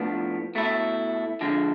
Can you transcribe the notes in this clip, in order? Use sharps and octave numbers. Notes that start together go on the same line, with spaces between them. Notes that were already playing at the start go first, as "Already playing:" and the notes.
Already playing: A2 F3 B3 D4
B2 A3 E4
F2 D3 F3 G#3